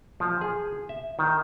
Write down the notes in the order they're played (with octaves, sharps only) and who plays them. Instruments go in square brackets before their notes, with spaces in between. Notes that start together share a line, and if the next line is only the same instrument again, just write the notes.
[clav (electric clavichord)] F3
G#4
E5
D#3